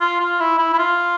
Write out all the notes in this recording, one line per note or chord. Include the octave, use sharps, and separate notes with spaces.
F4
F4
E4
E4
E4
F4